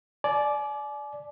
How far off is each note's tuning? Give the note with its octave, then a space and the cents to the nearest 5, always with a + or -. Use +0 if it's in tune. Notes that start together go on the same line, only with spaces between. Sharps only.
D5 +0 G#5 +40